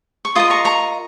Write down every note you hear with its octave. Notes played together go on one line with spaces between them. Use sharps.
C#6
F4 A#4 D#5 C6 D#6
A#5 C#6
A#5 C#6